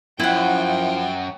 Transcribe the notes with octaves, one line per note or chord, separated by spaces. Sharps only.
F#2 F3 E4 F#5 G5